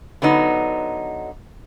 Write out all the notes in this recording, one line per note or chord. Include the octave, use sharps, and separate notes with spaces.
D3 F#3 B3 D#4